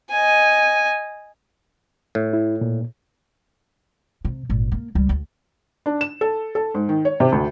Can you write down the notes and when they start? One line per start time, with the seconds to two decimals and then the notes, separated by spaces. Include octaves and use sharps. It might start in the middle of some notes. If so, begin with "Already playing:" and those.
0.10 D#5 G#5
2.15 A2
2.33 E4
2.61 A#2
4.25 C3
4.49 G#1 A#2
4.72 A#3
4.95 C#2 G3
5.09 D2
5.86 D4
6.01 E7
6.21 A4
6.55 A4
6.74 G#2
6.89 D#3
7.05 C#5
7.20 C3
7.32 D2